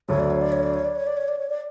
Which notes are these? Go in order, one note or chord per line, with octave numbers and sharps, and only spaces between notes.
D2 D3 F#3 C#5
D5
C#5
D5
C#5
D5
C#5
D5
C#5
D5
C#5
D5
C#5
D5